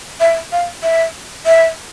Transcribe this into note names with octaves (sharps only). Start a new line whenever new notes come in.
E5
F5
E5
E5